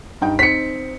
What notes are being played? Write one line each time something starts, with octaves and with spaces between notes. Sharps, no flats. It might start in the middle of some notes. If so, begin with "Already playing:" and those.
G2 D#4 G5
C4 D#4 B6 C#7